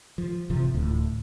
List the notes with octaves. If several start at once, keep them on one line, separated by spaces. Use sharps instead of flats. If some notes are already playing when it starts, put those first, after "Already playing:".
F3
F#1 C3 E3 F3
D1 D2 A2